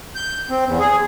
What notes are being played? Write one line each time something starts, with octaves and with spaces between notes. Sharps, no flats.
G6
C4
E2
G#4